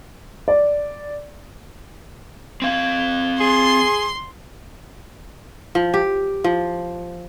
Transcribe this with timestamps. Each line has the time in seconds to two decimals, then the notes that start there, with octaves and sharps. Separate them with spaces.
0.48 D5
2.62 C4 F5
3.40 G#4 C6
5.75 F3
5.94 G4
6.44 F3